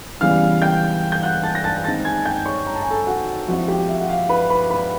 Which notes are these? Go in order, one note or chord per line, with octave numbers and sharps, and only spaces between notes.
C#3 E3 G3 B3 F5 F6
G5 G6
G6
F#5 F#6
A5 A6
A#6
A5 A6
D#3 G#3 C4 D#4 A5 A6
G#5 G#6
G5 G6
C#5 C#6
A#5
A5
G#5
A4 A5
F#4 F#5
F3 G#3 C4 E4 F#4 F#5
G4 G5
E5
F#5
F5
B4 B5
B4 B5
B4 B5